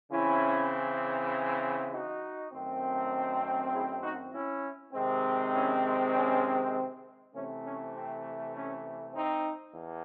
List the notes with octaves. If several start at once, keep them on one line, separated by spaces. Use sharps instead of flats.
C#3 E3 C4 C#4 E4
D#4 F#4
F#2 D#3 A3 C4
E4 G#4
D#4 F#4
C#4 E4
C3 D#3 G#3 C4
C#4 E4
C#4
C3 E3 A3 C4 C#4
C#4
C4
C#4
C4 D#4
E2